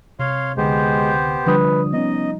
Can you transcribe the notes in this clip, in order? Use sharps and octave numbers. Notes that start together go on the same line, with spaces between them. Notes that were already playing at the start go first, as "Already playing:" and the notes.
C3 C#5 F5 C6
C#2 D3 G#3 B3 G4 C5
D3 F3 G3 D4 B4 D#6
B3 C#4 D#4 D#5